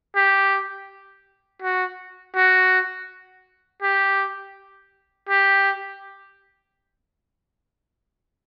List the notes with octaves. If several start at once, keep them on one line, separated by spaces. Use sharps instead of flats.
G4
F#4
F#4
G4
G4